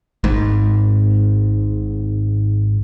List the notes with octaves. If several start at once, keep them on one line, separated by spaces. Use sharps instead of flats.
G#1 G#2